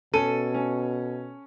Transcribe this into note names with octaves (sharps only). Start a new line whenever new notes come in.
B2 C#4 A4 D#7
C#4